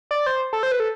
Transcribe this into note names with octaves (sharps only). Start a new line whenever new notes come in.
D5
C5
A4
C5
B4
A4